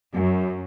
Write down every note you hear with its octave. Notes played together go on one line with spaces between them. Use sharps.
F#2